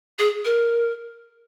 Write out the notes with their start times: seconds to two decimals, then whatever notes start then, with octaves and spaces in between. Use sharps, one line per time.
0.18 G#4
0.44 A#4